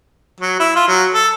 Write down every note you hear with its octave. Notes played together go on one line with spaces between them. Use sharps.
F#3
E4
F4
F#3
A4